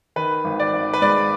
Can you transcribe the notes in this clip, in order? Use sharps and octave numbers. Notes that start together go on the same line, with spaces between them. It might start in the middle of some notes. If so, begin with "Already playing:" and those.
D#3 B4
G#1
D5
G#1
B4
G#2 D5